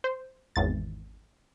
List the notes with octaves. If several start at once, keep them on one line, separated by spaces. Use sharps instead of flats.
C5
G#1 E2 A6